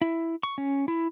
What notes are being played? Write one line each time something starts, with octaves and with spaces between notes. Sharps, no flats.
E4
C#6
C#4
E4